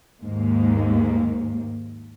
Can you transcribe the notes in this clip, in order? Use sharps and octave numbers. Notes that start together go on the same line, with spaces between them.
D#2 G#2 A#3